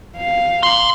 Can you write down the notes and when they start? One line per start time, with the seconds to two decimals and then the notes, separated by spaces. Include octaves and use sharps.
0.17 F5
0.63 A#5 C6